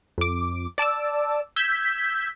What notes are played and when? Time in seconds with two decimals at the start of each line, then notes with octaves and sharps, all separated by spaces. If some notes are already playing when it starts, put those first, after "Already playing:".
0.18 F2 D6
0.78 D5 A5 D6 E6
1.56 E6 G6 G#6 B6